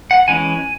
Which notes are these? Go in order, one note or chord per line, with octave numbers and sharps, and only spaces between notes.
F#5
E3 G#3 C#4 G#5